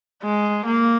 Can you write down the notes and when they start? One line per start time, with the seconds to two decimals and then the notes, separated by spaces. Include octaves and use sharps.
0.24 G#3
0.66 A#3